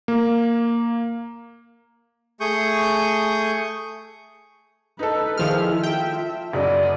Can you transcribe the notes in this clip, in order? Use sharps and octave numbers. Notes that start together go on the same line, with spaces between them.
A#3
A3 G#4 C#6 D#6 G6
D#4 A4 B4
D#3 F3 E4 G#4 F6
F4 E5 G5
F#1 C#3 F#3 D5 D#5